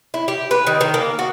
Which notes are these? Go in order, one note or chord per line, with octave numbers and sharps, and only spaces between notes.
E4
G4
B4
D#3
D#3
A#3
F#4